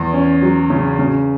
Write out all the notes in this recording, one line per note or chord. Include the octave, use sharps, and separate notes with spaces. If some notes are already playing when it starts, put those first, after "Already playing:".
Already playing: E2
C#4
F#3
C#3
C#3